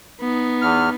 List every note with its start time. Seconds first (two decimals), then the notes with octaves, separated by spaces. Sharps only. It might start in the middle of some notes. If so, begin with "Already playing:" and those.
0.21 B3 D#4
0.62 E2 F6